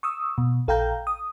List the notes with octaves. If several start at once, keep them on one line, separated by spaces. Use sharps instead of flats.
C#6 D#6 E6
B2
A#1 A4 F5 G5 A#5 G6
D#6